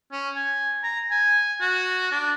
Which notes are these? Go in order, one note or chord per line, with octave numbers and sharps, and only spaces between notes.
C#4
G#5
A#5
G#5
F#4
D4